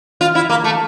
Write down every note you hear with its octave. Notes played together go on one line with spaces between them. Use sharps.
F4
E4
A#3
A3